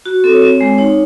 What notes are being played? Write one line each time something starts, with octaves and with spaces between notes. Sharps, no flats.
F#4
C4 A4
C#5
C4
G#3
D#4 C#5